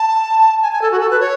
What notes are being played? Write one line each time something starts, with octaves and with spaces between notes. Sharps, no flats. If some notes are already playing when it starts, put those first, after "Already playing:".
Already playing: A5
G#5
G#5
A4
F#4
A4
B4
C#5